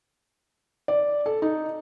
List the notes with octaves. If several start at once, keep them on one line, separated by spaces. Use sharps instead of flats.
D5
A4
D#4